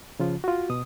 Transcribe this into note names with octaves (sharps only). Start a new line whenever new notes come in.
C#3 F3 F4
F4 F#4
B2 D#6